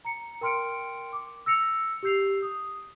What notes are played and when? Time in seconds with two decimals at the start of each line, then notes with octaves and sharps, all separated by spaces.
0.05 A#5 C#7
0.41 A#4 G5 C6 F6 C#7 D7
1.13 D6
1.46 E6 A#6 C#7 F7
2.03 G4 E6 G6 C7 F7
2.42 D#6